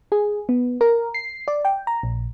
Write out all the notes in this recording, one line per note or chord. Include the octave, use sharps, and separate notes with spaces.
G#4
B3
A#4
C7
D5
G5
A#5
A#1